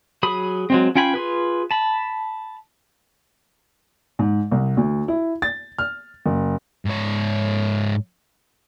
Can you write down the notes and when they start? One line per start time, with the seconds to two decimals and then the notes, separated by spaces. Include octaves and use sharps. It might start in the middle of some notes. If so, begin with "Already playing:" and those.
0.23 F#3 G#4 B5 D#6
0.70 F#3 G#3 C4
0.95 C#4 F4 G5 G#5 B5
1.14 F4 G#4 B4
1.71 A5 B5
4.19 G#2
4.51 C2
4.77 D2
5.08 E4
5.42 A6
5.78 F6
6.26 F#1
6.86 G#2 C#5